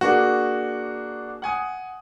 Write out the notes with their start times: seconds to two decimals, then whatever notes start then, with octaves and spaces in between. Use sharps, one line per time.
0.01 A#3 D4 F#4 G#4
1.42 F#5 G#5 D#6